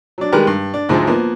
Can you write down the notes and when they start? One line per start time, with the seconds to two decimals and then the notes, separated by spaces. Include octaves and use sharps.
0.18 F#3 D4
0.32 D#3 G3 G#3 G4 A#4 B4
0.47 G2
0.74 D4
0.89 D2 G#2 D3 F3 G#3
1.07 F3 A#3 B3